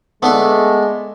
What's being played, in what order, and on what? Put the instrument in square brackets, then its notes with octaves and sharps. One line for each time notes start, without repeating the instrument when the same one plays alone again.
[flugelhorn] G#3 [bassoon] A3 [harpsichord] B3 D4 A4